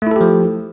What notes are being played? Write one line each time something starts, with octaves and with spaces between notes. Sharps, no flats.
F3 A3 E4 G4 A4